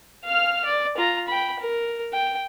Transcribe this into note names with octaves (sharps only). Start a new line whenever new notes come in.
F5 F6
D5
F4 A#5
G5 B5
A#4
G5